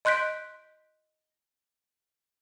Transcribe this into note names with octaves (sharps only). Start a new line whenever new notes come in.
D#5 C6 F#6 G6 B6 D7